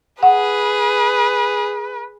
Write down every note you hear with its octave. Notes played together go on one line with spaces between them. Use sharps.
G#4 B4 F#5